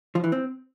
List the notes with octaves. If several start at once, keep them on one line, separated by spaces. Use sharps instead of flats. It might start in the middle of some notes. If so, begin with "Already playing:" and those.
F3
E3
C4